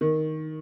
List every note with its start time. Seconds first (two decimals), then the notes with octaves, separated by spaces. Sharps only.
0.01 D#3